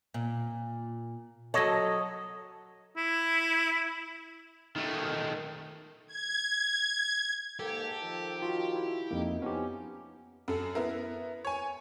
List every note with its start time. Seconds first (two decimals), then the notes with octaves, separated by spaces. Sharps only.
0.14 A#2
1.54 F#3 A4 C#5 D#5
2.97 E4
4.76 D#3 A3
6.07 G#6
7.59 G#2 A#3 G4 A4
8.02 D#3 F3
8.42 F4 F#4
8.75 E4
9.11 F2 A#3 D#4
9.42 F3 B3 C#4 D#4 G4
10.48 F#2 A4
10.75 B3 E4 A#4
11.45 C#5 G#5